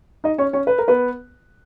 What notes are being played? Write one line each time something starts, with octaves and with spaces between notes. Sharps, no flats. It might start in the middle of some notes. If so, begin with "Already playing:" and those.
D#4 D#5
C#4 C#5
C#4 C#5
B4
A#4
B3 B4